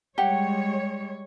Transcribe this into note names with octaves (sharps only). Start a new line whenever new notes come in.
G3 G#3 G4 C#5 F#5